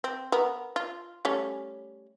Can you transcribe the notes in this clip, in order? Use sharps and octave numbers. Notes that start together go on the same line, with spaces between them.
C4
B3 A#4
F4
G3 A3 C#4